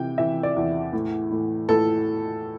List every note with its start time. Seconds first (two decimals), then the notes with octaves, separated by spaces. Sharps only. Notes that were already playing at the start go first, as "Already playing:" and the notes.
Already playing: C3 E3 G5
0.18 E3 E5
0.43 D5
0.56 E2
0.93 A2
1.31 A2
1.69 A2 A4